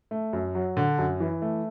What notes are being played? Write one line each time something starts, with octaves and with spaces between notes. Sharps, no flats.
A3
F#2
F#3
D3
F#2
E3
A3